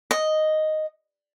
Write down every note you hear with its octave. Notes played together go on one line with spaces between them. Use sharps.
D#5